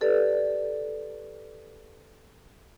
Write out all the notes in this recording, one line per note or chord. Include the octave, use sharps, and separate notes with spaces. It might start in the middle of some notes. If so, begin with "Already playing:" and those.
G4 A4 B4 D5